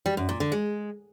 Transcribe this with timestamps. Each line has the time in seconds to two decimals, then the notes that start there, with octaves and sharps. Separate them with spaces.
0.06 G3
0.17 F#2
0.29 A#2
0.40 D3
0.52 G#3